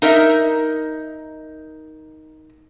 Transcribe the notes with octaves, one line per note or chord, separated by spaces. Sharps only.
D#4 A#4 D#5 E5